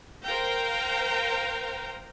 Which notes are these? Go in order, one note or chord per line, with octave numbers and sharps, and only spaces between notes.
A#4 C5 F5 G5 A#5